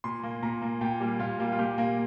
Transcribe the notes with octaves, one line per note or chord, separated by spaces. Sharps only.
A#2 C6
A#3
A#2 A#5
A#3
A#2 G5
G3 A#3
A#2 F4
G3 A#3
F4
A#2 G4
A#3